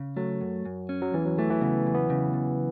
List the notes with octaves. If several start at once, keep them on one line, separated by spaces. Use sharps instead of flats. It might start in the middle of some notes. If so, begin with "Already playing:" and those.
Already playing: C#3
F#3 A3
F#2
F#2
C#4
F#3
E2 E3
F#3
E3 A3
E3
C#3 B3
E2
B3
C#3
E2